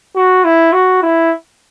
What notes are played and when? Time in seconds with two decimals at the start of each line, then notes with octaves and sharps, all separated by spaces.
0.16 F#4
0.44 E4
0.73 F#4
1.02 E4